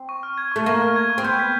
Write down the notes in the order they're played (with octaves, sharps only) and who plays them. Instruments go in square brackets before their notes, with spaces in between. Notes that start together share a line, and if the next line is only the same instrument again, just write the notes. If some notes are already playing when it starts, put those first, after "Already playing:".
Already playing: [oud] C4
[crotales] C#6
F6
G#6
[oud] A3 [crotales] C#6
[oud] A#3 [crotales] C#6
[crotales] F6
G#6
C#6
[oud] C4
[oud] B3 [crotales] G6
[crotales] B6